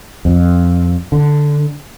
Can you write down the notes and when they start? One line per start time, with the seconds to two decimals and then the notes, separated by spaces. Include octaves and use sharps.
0.25 F2
1.12 D3